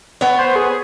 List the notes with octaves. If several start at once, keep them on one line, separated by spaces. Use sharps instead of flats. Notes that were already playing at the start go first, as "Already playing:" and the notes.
B3 C#5
C5
G#4